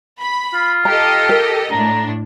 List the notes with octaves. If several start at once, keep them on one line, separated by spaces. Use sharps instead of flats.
B5
F4
G4 A4 D#5 A#5
A#4
A2 D4 A#5